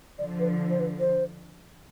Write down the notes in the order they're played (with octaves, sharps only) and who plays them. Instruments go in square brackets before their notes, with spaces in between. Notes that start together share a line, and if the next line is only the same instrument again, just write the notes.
[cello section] D3 F3 [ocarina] D5
[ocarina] B4
C5
B4
C5